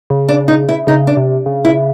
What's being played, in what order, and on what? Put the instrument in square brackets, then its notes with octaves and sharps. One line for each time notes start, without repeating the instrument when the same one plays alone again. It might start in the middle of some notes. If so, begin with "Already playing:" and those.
[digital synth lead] C#3
[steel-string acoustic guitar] D4
D#4
E4
[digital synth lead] C#3 [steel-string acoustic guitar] D#4
[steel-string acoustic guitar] D4
[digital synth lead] C3
C#3
[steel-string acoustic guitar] E4